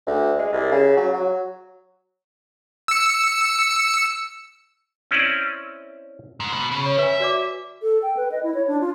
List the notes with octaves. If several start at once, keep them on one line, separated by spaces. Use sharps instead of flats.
D2
G#3
C2
C#3
F#3
F#3
E6 C#7
C4 C#4 E4 D5 D#5
G#2
B2
C#3
C#5
B4 E5 G#5
F#4 D5 D6
A4
G5
B4
D#5
E4
C#5
D4
F4